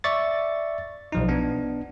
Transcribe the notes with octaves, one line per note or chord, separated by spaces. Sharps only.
D5 E5 C#6 A6
B1 F3 D#4
B3 D4